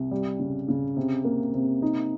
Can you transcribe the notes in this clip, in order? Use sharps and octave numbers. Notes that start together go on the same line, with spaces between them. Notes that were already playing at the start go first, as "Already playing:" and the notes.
Already playing: C2
G3
C#3
C#3
C3
A#3
C3
D#4